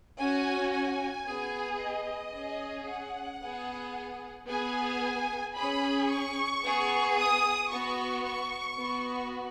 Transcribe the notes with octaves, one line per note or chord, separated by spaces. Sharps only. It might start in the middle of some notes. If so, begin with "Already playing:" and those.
C#4 F#4 G#5
G#5
B3 G#4
D#5
C#4 G#4
F#5
B3 G#4
B3 G#4 G#5
C#4 G#4 B5
C#6
B3 G#4
D#6
B3 F#4 C#6
C#6
B3 F#4